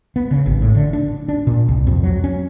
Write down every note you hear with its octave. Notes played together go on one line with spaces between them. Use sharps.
B3
C#3
G#1
A2
D3
D4
D4
A#2
C2
F2
F#3
C#4